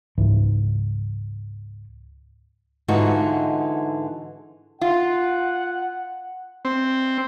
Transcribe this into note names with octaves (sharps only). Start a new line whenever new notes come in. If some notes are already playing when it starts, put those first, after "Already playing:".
C#2 G#2 C#3 E3
G#2 D3 E3 D#4 F4 F#4
F4 F#5
C4